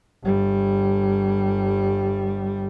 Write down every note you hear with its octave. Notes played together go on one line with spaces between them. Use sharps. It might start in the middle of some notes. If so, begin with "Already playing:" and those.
G1 G3